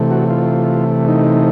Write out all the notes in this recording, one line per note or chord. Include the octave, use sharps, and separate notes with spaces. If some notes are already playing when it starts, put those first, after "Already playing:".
Already playing: C3 E3 A3
F#4
F4
D#4